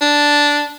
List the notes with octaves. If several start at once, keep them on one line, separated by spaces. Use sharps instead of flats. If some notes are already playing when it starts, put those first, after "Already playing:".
D4